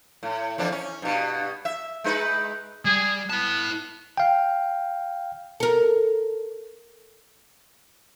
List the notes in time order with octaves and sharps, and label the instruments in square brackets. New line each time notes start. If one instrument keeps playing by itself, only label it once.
[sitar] A2
F2 E3 D4
C#4
G2 B2
E5
G#3 D#4 B4
[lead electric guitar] G3 [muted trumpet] G#4
[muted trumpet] B3 [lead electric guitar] E4 A5
[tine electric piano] F5 G5
[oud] A4 A#4